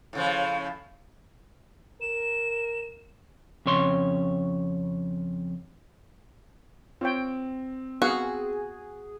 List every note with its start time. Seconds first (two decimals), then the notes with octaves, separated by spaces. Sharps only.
0.13 A2 C#3 F3
2.01 A#4 E7
3.66 F2 C#3 C#5 C6
7.01 C4 F4 C#5 G5
8.02 B3 F#4 G#4 F5 F#5